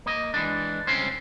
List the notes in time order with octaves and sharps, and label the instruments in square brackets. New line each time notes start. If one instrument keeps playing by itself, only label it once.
[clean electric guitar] A#3 D#5
E3 G#3 D4
C#2 G3 C4 C#4 C5